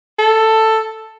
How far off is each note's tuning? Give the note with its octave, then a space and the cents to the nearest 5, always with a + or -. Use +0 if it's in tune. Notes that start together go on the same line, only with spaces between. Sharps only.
A4 +10